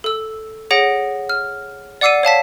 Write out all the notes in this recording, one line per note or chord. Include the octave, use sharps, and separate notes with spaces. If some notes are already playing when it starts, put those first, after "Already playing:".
A4 E6
G#4 C#5 F#5 A#6 D7
F6
D5 F#5 D6 E6 C7 D#7
C#5 F5 A5 B6